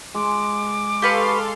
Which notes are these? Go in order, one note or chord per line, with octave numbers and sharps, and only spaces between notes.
G#3 D6
G4 A4 B4 F5 C6 C#6